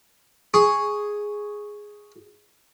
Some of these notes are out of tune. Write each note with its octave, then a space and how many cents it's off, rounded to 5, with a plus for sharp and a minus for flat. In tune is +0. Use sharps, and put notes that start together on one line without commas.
G#4 +0 C#6 +0